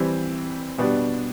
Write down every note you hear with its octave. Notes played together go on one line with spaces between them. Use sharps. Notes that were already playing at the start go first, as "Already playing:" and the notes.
Already playing: E3 G3 C4
B2 G3 B3 D4